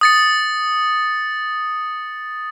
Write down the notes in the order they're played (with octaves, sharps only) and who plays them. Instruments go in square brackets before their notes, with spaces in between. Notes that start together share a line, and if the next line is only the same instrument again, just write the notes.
[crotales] D#6 A6 C#7